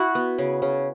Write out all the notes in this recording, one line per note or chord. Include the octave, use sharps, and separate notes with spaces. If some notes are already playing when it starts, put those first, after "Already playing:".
Already playing: E4 F#4
B3
C#3
C#3